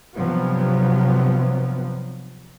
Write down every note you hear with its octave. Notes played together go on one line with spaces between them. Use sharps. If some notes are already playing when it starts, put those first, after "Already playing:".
G2 C3 F3 F#3 B3